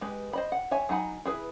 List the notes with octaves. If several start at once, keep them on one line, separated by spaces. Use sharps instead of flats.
G#3 G4 B4
C5 D#5 B5
F#5
C#5 E5 G#5
F#3 D#4 F#5 G#5 B5
E4 G#4 B4